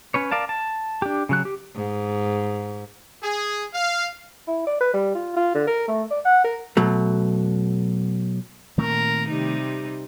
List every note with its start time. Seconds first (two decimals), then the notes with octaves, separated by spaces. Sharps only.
0.14 C#4 B4 C#5
0.31 A#4 D5 F5 A5
0.49 A5
1.02 D4 G4
1.29 C#3 F#3 F#6
1.45 G4
1.75 G#2
3.21 G#4
3.74 F5
4.47 E4
4.67 D5
4.81 B4
4.94 G3
5.15 F4
5.36 F4
5.55 D3
5.67 A#4
5.88 A3
6.11 D5
6.25 F#5
6.44 A#4
6.77 B2 F#3 A3
8.78 A#2 D#3 A3 C4 A#4
9.28 C3 G3 D#4